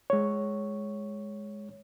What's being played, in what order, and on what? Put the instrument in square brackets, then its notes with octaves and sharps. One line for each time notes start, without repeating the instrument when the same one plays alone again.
[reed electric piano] G#3 C#5